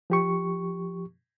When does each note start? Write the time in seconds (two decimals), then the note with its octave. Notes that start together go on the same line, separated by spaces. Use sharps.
0.10 F3 G4 C#6